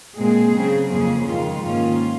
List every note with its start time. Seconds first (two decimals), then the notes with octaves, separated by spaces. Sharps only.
0.16 A#2 G#3 C4 G#4
0.54 C#3 F#3 C4
0.91 F2 C#3 F3 A#3 C#4 G#4
1.27 F2 D#3 G#3 F4
1.65 G#2 D#3 A#3 C#4